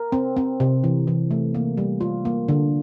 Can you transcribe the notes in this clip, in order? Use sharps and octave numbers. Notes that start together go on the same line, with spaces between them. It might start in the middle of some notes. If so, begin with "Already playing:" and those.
Already playing: A#4
C4
C4
C3
E3
E3
A3
A#3
G3
F4
A#3
D3